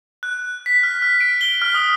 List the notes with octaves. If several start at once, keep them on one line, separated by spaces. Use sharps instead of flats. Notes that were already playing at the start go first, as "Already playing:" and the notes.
F#6
B6
F6
F6
D7
G7
F6
D#6